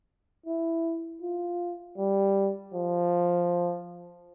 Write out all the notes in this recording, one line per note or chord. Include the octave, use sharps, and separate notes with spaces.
E4
F4
G3
F3